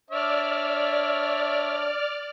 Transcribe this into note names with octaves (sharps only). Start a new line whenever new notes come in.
D4 C#5 D5 E5 F6